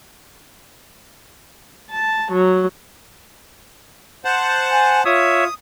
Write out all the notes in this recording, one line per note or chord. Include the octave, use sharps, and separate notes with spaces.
A5
F#3
C5 F#5 A5
G#5
F4 C#5 E5 D#6